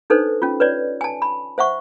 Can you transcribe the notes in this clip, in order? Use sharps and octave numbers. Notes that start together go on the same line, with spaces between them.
D4 D#4 A4 B4 C5
C#4 F4
B4 C#5 D5
G#5 A5
B5
C5 E5 F#5 C#6